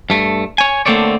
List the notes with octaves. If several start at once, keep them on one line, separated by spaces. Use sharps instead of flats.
G2 A3
C#5 G#5
D3 A3 A#3 C4 C#5 D5